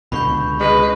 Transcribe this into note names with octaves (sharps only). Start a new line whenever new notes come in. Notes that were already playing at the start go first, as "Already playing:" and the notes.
C#2 B2 D3 B5 C#6 G6
G#3 B4